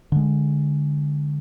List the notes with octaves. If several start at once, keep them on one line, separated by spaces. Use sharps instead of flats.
D3 G#3